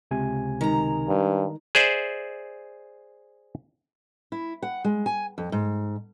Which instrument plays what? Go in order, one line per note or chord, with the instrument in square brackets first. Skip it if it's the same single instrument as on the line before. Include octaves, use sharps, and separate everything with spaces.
[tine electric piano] C#2 C3 G#5
[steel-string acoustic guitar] D#3 G#3 A#5
[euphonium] G2
[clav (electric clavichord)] G#4 C5 D5 E5
[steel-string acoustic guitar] E4
F#5
G#3
G#5
F2
G#2